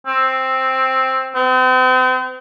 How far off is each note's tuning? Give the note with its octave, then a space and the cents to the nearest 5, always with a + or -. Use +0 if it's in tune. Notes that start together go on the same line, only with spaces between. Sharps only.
C4 +5
C4 -40